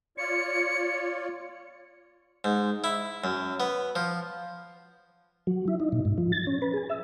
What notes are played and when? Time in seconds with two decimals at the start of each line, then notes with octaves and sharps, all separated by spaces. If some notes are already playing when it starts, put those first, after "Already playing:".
0.18 F4 C#5 D5 C#7
2.44 G#2
2.84 E4
3.24 F#2
3.60 B3
3.96 F3
5.47 F#3
5.68 E4
5.80 D#4
5.92 A#2
6.05 G#2
6.18 F3
6.32 A6
6.47 C#4
6.62 B4
6.74 G#4
6.90 E5